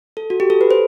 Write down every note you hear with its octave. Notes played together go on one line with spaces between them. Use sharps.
A4
F#4
G4
A4
B4
C5